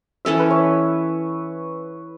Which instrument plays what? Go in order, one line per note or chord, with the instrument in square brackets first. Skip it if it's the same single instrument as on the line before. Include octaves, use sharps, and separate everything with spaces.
[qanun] E3 C#4 A4 [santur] E5
[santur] B4
C#5